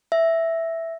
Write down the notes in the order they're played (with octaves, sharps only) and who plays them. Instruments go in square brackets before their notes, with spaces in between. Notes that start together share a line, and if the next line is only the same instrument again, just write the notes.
[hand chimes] E5